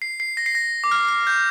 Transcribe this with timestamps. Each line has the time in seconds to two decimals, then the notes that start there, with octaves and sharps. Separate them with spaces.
0.02 C7
0.20 C7
0.37 A#6
0.46 C7
0.55 A#6
0.84 D6
0.91 F6
1.09 F6
1.27 G6